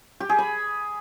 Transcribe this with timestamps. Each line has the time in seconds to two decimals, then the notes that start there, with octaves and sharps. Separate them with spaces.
0.20 G4
0.29 G#4
0.39 B5